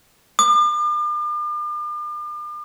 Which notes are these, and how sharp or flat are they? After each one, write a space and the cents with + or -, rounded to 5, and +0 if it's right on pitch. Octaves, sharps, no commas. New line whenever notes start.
D6 +40